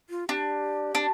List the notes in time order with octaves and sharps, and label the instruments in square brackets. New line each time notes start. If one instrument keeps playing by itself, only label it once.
[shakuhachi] F4
[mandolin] D4 [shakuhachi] G4
[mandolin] D4